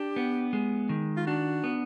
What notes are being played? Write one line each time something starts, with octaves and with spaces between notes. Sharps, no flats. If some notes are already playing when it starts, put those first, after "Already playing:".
Already playing: D4 G4
B3
G#3
D#3
F4
D4 F#4
B3